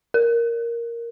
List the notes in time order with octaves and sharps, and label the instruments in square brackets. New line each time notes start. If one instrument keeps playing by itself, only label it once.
[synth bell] A#4